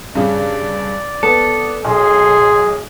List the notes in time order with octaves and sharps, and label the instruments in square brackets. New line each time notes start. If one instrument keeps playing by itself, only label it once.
[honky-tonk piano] G2 C#3 [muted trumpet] D5
[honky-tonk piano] B3 [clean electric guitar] A4
[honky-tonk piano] B1 [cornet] G#4 [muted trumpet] C6